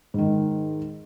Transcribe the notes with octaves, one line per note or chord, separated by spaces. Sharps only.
G#2 D#3